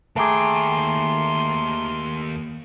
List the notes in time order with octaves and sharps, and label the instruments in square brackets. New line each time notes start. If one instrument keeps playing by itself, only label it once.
[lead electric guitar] D#2 G5 [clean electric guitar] A3 G#4 [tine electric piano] A5 A#5 D6 [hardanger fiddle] C6